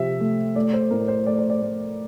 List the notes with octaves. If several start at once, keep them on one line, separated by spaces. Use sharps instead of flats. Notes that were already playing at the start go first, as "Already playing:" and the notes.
Already playing: C3 F3 E5
A3
A3 D5
C5
A2 A#4
C5
A3 D5
C5
D5
A3